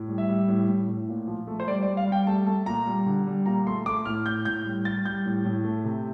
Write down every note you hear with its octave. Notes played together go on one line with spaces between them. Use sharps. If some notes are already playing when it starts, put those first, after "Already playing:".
Already playing: A2
G3
E5
G3
A2
A2
A2
A#2
F3
A3
C5
G3 D5
D5
G3
F5
G3
G5
A3 A5
A3 A5
A#2 A#5
G3
D3
G3
A#2 A#5
A3 C6
A3 D6
A2 F6
A2 G6
A2 G6
G3
G3 A6
G3 G6
A2
A2
A3
C3